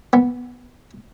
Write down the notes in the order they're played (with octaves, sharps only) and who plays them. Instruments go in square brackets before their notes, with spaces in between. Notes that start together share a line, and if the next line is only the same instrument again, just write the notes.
[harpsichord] B3